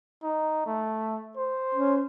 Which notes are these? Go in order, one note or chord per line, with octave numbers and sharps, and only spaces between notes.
D#4
A3
C5
C#4